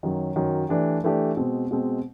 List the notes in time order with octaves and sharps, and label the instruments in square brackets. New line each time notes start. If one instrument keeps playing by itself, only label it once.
[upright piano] F#2 D#3 F#3
F#2 D#3 F#3
E3 A3 D4 G4
E3 A3 D4 G4
B2 G#3 C4
B2 G#3 C4